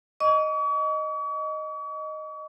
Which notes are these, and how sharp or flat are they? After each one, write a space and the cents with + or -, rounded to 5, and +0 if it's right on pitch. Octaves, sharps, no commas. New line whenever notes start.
D#5 +0 C#6 +45